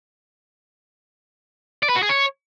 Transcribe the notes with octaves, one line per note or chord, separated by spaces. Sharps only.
D5
B4
F#4
G#4
C#5